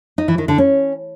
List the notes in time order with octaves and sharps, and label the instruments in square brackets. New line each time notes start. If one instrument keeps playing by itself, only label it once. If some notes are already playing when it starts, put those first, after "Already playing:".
[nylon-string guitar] D#4
E3
D#3
D3
C#4